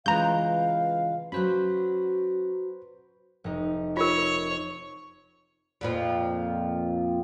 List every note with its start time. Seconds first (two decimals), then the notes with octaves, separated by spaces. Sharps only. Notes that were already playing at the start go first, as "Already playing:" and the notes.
0.06 C#3 E3 G#3 F4 B4 F5 A#5 G6
1.32 F#3 C#4 F#4 B4 C5 B5
3.44 F1 D#4
3.97 F4 A#4 C#5
5.81 F2 A#2 F3